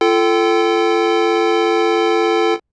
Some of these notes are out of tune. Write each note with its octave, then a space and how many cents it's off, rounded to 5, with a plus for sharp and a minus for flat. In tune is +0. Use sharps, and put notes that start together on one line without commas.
F4 -30 A4 +0 G5 -15